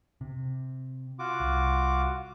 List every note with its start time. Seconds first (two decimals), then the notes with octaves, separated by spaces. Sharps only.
0.21 C3
1.19 F4 F#4 D6
1.40 C2